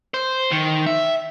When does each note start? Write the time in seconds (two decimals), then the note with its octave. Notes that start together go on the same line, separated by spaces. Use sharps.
0.14 C5
0.52 D#3
0.87 E5